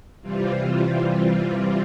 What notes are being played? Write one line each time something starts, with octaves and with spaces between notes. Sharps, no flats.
C3 E3 G3 C4 F4